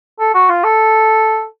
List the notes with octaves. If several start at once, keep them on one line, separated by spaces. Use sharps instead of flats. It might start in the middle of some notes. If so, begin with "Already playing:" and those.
A4
F#4
F4
A4